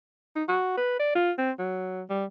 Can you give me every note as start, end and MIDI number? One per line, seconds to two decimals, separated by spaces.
0.36 0.44 63
0.48 0.72 66
0.78 0.98 71
1.00 1.13 74
1.15 1.32 65
1.38 1.51 60
1.59 2.03 54
2.10 2.25 55